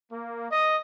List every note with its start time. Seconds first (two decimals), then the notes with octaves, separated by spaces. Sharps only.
0.10 A#3
0.50 D#5